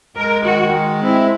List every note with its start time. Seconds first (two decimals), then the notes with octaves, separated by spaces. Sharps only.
0.16 G#3 A#4
0.44 D#3 F#4
0.73 G#3
1.02 C4 E4